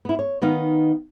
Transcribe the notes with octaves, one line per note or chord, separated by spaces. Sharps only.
B3 E4
C#5
D#3 B3 D#4 F5